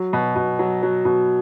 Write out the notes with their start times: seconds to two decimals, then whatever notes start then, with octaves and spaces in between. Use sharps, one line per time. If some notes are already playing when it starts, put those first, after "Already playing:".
Already playing: F#3
0.13 B2
0.36 B2
0.59 F#3
0.83 F#3
1.05 B2